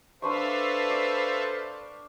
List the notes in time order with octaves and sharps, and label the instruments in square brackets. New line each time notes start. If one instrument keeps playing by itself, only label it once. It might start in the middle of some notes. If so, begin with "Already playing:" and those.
[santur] D4 C6 C#6 [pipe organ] A4 E5 F5 [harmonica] B4 C5
[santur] D5